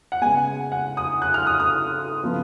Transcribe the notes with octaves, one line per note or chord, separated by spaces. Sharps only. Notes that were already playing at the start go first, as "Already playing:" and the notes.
F#5
C#3 G#3 B3 G#5
F#5
D#6
F#6
F6
D#6
D#6
C#3 F3 B3